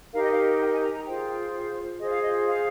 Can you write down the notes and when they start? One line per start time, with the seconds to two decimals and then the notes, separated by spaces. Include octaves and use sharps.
0.13 D#4 G4 A#4 F5
0.22 D#5
0.32 F5
0.60 G5
0.72 G#5
0.84 A#5
0.95 A#5
1.07 F4 G#4 C5 G5
2.00 F4 G#4 C5 D#5
2.11 F5
2.22 D#5
2.47 F5